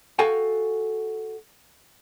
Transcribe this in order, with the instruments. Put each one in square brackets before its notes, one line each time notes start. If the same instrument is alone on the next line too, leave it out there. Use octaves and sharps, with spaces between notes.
[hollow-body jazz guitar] F#4 A4 F5 G5 G#5